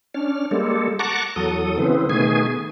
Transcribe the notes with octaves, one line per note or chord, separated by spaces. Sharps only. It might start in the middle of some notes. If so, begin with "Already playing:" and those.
C#4 D4 F6
G3 G#3 A#3 A4
F#5 A5 A#5 C#6 D6
E2 F#3 A4 D#6
C#3 E3 B3 C4
B2 D#3 A3 B3 G#4 G#5